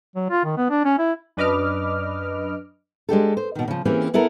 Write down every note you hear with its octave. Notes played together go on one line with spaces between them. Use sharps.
F#3
F4
D#3
B3
D4
C#4
E4
F#2 D4 B4 D#5 D6 F6
G#3 D4 G4 A4
C5
B2 D#3
C#3 F3
E3 A#3 C4 C#4 G4 G#4
B3 E4 A4 A#4